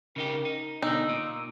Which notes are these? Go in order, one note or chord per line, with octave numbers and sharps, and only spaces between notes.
C#3 D#4 G4 A#4
D#4
B2 D3 D#4 E6
A#2